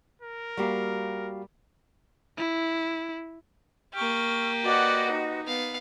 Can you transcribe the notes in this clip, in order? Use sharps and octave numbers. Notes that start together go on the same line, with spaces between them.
A#4
G3 A#3 F#4 G4 F5
E4
A#3 G4 C#6 F6
F#4 B4 D5 D#5 F#5
D#4
B3 F5